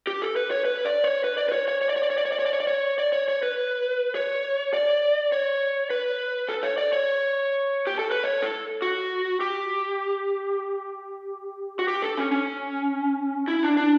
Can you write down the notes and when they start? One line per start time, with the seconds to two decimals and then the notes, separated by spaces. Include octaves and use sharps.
0.07 G4
0.22 A4
0.36 B4
0.51 C#5
0.65 B4
0.85 D5
1.04 C#5
1.24 B4
1.38 D5
1.49 B4
1.52 C#5
1.68 C#5
1.81 C#5
1.89 D5
1.96 C#5
2.03 D5
2.10 C#5
2.18 D5
2.25 C#5
2.32 D5
2.39 C#5
2.46 D5
2.53 C#5
2.60 D5
2.67 C#5
2.99 D5
3.13 C#5
3.28 C#5
3.43 B4
4.15 C#5
4.74 D5
5.32 C#5
5.90 B4
6.49 A4
6.63 C#5
6.78 D5
6.93 C#5
7.87 G4
7.99 A4
8.11 B4
8.24 C#5
8.43 A4
8.82 F#4
9.41 G4
11.79 F#4
11.88 G4
12.02 A4
12.17 C#4
12.31 C#4
13.48 E4
13.63 D4
13.77 D4